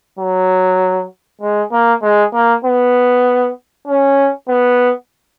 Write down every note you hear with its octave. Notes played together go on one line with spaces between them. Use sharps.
F#3
G#3
A#3
G#3
A#3
B3
C#4
B3